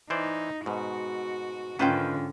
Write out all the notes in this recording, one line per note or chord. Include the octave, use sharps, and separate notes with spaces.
E3 D#4 C5 D5
G#2 B2 F#4
G#2 D3 D#3 C#4 F4 B4 C5 G5